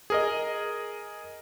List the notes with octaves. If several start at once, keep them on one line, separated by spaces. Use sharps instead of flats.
G#4 A#4 D#5